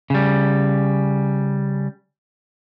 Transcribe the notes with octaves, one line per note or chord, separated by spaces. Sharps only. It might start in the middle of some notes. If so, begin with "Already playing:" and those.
C#3 G3